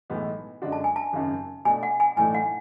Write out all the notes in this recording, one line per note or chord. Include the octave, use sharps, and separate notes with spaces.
B1 A2 E3 G#3 B3
F#2 D3 G#3 D4 F#4
A5
G#5
A5
G#1 F#2 C#3
B2 A3 D4 G#5
F#5
G#5
B1 A2 E3 A3 D4 G#5
F#5